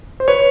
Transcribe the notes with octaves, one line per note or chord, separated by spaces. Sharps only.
C5
B4 C#5